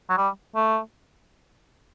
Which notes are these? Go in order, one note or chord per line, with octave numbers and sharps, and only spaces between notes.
F#3
G3
A3